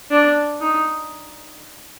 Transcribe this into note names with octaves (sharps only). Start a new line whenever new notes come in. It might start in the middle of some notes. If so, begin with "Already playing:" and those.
D4
D#4